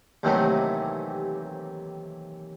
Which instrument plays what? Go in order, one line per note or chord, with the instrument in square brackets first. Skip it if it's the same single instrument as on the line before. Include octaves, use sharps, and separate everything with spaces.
[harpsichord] D#2 C3 D#3 E3 F#3 A3